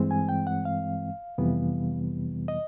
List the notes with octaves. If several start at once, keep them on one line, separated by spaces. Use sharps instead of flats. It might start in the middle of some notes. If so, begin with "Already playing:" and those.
Already playing: G2 E3 G#3 C4
G#5
G5
F#5
F5
F2 C3 E3 G3 B3
D#5